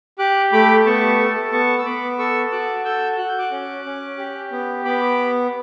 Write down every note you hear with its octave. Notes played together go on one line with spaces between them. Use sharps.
G4 D6 F#6
A3 B5 D6
B3 A5 C#6
A4
B3 A5 C#6
E6
B3 B5 D6
A4 C#6 E6
F#4 D6 F#6
A4 E6 G6
F#4 F#6
G6
D6 F#6
C#4
C#4
G4
B3
B3 B5 D6